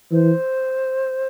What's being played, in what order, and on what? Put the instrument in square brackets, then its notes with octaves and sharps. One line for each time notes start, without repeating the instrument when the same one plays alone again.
[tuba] E3 [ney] C5